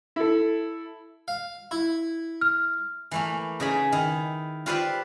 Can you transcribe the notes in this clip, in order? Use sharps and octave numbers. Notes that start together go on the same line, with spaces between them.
E4 A4
F5
E4
F6
E3 A3 A#3
C#3 D#4 G#5 B5
D#3 E4
F4 G4 B4 C5 D5 E5